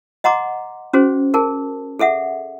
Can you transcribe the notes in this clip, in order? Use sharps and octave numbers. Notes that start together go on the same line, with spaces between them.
D#5 F#5 A#5 C6 D6
C#4 F#4 G#4 C5
G#4 A#4 A5
G#4 A4 E5 F#5